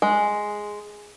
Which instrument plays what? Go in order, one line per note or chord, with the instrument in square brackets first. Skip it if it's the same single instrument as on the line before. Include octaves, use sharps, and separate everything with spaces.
[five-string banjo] G#3